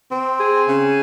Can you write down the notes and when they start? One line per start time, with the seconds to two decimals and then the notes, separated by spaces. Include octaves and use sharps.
0.10 C4
0.39 G#4
0.67 C#3